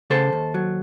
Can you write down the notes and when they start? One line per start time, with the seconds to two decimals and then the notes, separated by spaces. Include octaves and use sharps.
0.10 C#3 A4 C5
0.32 D#2
0.54 F#3